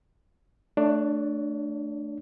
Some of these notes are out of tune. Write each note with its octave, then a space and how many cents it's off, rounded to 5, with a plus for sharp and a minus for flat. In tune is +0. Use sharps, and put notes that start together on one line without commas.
A3 +5 D4 +15 C#5 +40